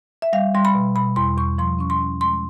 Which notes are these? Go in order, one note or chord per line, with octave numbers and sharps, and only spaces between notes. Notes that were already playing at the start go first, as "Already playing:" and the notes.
E5
G3 F5
G3 C6
B5
B2
B2 B5
E2 C6
E2 C#6
F3 C6
C#4 C#6
C6
C#4
G#3 C6